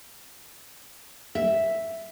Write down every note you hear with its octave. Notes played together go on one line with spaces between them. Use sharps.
E5